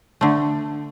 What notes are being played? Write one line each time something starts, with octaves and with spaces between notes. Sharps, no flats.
D3 A3